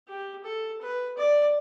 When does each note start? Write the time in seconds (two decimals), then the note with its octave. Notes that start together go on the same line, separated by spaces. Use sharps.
0.08 G4
0.44 A4
0.82 B4
1.18 D5